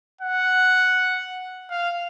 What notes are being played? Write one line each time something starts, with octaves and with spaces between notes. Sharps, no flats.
F#5
F5